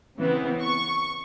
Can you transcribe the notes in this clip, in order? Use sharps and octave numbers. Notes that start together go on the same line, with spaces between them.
C#3 E3 B3 C4
C#6